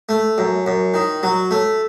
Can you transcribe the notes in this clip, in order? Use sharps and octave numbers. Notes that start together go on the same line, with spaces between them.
A3
F#2
F#2
D#3
F#3
A3